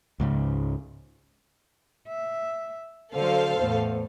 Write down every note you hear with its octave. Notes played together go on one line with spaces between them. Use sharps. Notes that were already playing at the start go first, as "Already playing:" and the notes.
C#2 G#2 C#3
E5
D3 F#3 A4 C5 F5
E2 A2